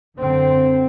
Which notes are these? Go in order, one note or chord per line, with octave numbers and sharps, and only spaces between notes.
F#2 D3 C4